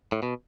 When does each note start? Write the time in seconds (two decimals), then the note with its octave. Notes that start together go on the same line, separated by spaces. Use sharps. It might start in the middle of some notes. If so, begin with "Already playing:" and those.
0.12 A2
0.23 B2